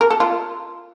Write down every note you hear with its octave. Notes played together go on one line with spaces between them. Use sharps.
A#4
A4
F4